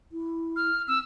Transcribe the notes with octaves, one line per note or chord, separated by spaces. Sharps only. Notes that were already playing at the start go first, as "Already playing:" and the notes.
E4
F6
C4 E6